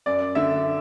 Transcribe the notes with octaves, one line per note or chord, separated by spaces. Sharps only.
F#2 D5
D3 E5